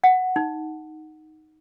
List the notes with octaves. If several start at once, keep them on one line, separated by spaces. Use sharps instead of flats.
F#5
D#4